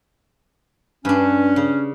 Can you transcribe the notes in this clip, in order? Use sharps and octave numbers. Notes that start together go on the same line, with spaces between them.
G2 C#4 D4
C#3